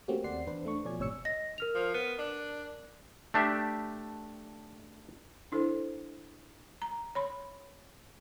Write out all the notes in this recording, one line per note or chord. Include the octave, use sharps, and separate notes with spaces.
A3 A#3 C4 C#4 F#4 G4
D#2 C4 D5 F#5 C6 C7
E2 D4 B4 C5
A3 D4 C#6
B2 F3 C#5 D5 G#5 G#6
G1 A2 C3 C#5 E6 C#7
D#5 A#6
A#4 F6 F7
F3
B3
D4
A3 D4 G4 E5
D4 E4 A4 C5
A#5
C#5 B5 C6